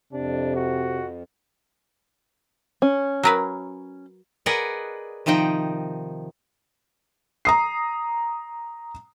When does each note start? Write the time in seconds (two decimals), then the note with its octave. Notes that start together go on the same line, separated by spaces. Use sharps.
0.13 F2 C3 D4
0.56 F#4
2.82 C#4
3.23 F#3 A#4 B4
4.46 G#4 A#4 B4 D5 D#5 F#5
5.26 C3 D#3 F3 D#4 G5
7.45 A#5 D#6 C7